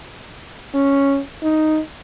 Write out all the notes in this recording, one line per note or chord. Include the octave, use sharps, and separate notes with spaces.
C#4
D#4